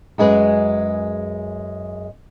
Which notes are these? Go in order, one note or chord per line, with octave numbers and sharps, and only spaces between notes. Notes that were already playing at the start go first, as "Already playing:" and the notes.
F#2 G#3 G#4 B4